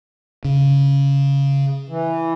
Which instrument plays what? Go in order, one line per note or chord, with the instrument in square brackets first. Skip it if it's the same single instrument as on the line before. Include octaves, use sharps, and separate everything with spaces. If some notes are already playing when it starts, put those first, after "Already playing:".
[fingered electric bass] C#3
[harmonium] E3